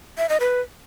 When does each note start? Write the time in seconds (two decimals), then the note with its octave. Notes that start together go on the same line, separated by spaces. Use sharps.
0.18 E5
0.29 D#5
0.40 B4